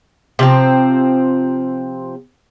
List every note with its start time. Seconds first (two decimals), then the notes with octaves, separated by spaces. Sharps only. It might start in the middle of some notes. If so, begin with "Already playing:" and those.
0.39 C3 F3 C4